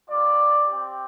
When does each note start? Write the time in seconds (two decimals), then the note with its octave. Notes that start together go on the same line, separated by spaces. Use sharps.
0.10 G3 F4 D5
0.67 C4 G4